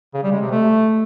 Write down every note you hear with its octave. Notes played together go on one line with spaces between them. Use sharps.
C#3
G3
G#3
C3
A3